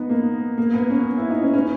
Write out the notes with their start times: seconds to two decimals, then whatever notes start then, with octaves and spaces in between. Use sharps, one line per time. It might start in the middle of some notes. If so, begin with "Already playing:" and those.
Already playing: B3 D#4
0.10 A#3
0.58 A#3
0.74 B3
0.90 C#4
1.18 E4
1.30 D#4
1.43 C#4
1.54 C#4